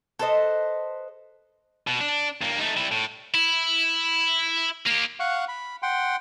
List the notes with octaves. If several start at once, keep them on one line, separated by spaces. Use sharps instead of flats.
A4 B4 C5 D#5
B2
D4
G2 A#3
A3 D#4
G3 E4
A2
E4
A#3 G4
F5 F#5 C#6 F#6
B5
F#5 G5 C6